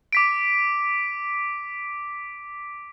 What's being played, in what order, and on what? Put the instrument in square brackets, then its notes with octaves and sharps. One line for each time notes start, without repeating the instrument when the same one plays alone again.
[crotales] D6 B6 D7